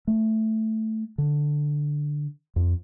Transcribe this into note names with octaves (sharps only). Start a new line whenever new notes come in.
A3
D3
F2